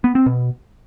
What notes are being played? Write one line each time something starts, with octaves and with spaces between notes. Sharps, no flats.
B3
C4
B2